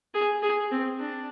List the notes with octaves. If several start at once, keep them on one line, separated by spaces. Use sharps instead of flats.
G#4
G#4
C4
D4